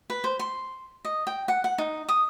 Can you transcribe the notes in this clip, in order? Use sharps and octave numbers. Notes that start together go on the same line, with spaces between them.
B4
C5
C6
D#5
G5
F#5
F#5
D#4
D#6